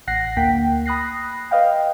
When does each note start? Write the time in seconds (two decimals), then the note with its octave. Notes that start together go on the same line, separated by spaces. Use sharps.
0.07 A1 F#5 F#6 A#6 C7
0.37 D2 A#3 G5 B6
0.86 B5 D#6 F#6 A#6 C7
1.51 B4 D#5 F5 G5